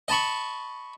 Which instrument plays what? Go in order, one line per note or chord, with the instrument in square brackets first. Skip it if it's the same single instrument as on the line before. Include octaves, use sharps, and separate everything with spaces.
[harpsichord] D#5 A5 B5 C#6